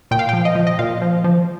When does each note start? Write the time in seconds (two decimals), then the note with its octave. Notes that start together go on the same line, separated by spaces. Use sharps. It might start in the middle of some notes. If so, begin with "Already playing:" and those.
0.11 A#2 G5
0.19 F5
0.29 F3 G5
0.45 D#5
0.55 F3
0.67 D#5
0.79 A#2 F5
1.02 F3
1.24 F3